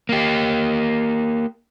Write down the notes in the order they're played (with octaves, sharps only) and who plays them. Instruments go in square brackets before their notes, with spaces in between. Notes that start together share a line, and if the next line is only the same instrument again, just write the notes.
[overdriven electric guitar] A#3 G4